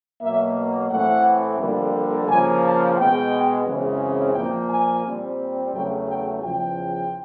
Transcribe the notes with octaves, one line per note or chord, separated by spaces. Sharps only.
B2 F#3 A#3 E5
A2 E3 A3 C4 F#5
F2 D3 G3 A#3
C#3 F3 A#3 G#5
A5
B2 G#3 B3 G5
F#2 C#3 E3 G#3 C4
A#2 F3 A#3 G5
G#5
A#2 G3 C4
E2 C#3 F#3 A3 G5
G5
E2 C#3 F3 G5